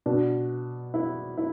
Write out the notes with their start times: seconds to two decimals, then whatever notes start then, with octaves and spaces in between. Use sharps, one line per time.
0.06 B2 D4
0.94 E4
1.37 E4